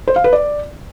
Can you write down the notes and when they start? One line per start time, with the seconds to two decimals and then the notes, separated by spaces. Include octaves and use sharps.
0.08 C5
0.16 F5
0.24 B4
0.33 D5